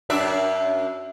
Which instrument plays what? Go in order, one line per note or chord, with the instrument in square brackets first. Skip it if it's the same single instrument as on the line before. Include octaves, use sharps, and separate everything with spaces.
[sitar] F#2 D4 E5